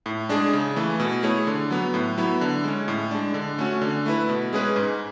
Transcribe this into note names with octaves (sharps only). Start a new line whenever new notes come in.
A2
G#3 D4 G#4
C#3
E3 A3
B2
A3 E4 G#4 C#5
D3
F#3 B3
A2
F#3 B3 E4
D3
G#3 C#4
A2
G#3 D4
D3
A3 C#4 F#4
D3
A3 E4 B4
B2
G#3 C#4 G#4 B4
G#2